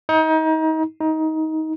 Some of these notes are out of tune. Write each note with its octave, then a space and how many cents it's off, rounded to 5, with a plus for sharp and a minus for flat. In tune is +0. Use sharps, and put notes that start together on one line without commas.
D#4 +30
D#4 +20